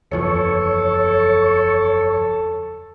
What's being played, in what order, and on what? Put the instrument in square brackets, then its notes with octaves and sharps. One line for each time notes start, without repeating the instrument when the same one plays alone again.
[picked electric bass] F#1 E2 F3 [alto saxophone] A4 [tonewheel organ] C#5